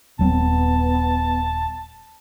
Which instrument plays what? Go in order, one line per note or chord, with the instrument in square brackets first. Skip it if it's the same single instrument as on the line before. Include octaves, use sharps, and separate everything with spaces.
[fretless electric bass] D#1 F#3 C4 [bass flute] B3 [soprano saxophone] A5